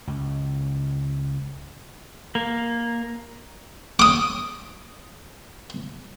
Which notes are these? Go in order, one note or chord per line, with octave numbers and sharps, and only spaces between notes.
C#2
A#3
D6 D#6